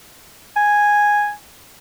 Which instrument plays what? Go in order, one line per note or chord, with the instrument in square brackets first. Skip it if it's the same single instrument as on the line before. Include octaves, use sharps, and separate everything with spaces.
[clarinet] G#5